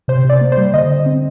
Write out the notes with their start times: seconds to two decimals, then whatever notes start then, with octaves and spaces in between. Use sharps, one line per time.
0.08 C3 C5
0.25 C3 D5
0.41 A#3
0.52 C5
0.57 G3
0.74 D3 D#5
0.90 D3
1.06 C4